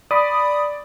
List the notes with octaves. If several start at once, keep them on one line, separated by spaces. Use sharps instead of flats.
D5 B5 D#6